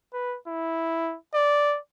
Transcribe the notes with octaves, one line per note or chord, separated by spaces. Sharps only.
B4
E4
D5